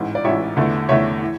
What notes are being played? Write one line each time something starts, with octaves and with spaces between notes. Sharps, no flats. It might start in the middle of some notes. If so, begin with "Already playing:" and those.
Already playing: A1 G#2 E3
D5
A1 G#2 E3 C#5 E5
E2 D3 A3
E2 D3 A3 C#5 E5
E3